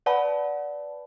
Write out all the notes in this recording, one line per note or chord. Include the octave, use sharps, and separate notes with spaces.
B4 D5 F#5 A5 B5